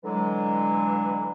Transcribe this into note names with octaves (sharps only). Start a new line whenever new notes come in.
D3 E3 F#3 G#3